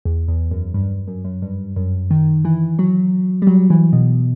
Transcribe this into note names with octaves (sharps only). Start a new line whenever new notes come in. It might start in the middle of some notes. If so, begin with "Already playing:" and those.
E2
E2
F#2
G2
F#2
F#2
G2
F#2
D#3
E3
F#3
G3
F#3
E3
B2